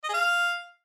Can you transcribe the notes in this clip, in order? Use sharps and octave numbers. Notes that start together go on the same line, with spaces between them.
D#5
G#4
F5